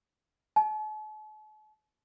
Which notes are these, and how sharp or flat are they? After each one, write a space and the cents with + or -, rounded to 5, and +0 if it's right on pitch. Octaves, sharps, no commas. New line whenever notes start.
A5 -45